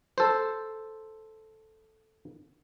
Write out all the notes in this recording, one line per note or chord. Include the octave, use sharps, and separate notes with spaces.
A4 C5